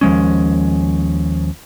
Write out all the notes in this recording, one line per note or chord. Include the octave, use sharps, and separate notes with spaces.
D#2 F3 G#3 C#4